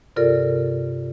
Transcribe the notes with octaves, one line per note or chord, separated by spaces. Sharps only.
G2 C3 F4 A4 A#4 D5